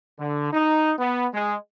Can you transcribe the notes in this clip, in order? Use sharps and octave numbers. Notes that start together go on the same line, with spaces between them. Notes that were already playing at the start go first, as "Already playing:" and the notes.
D3
D#4
B3
G#3